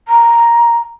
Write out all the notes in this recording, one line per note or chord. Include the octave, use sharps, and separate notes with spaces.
A#5